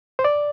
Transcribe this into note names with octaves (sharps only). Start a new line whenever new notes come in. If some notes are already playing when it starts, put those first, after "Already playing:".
C5
D5